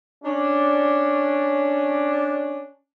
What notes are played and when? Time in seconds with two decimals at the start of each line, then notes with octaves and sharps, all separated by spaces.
0.24 C#4 D4